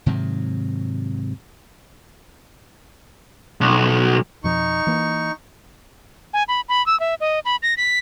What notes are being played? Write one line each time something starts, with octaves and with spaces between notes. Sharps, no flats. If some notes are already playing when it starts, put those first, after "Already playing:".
G#2 C3 D#3 F#3
B1
F2 B2 F3 D#4 C#6
E3 A#3
G#5
B5
B5
E6
E5
D#5
B5
A#6
B6